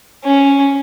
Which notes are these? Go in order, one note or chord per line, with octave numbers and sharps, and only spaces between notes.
C#4